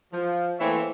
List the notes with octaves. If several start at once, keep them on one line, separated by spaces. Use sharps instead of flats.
F3
E3 A3 A#3 C4 C#5 E5